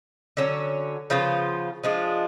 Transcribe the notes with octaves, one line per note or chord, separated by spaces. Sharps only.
D3 F#3 C#4
C#3 F3 B3 F4
F3 G#3 D4 F4